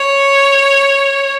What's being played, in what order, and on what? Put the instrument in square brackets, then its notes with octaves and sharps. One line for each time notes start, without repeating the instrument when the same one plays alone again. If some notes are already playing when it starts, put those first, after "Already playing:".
Already playing: [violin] C#5